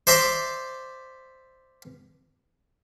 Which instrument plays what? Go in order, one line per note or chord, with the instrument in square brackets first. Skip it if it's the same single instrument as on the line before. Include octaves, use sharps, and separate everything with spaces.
[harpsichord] C5 D5 E5 A#5 C6 D6